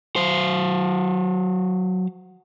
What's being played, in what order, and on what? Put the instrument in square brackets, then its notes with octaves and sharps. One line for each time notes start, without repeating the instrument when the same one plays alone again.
[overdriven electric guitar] F#3 C5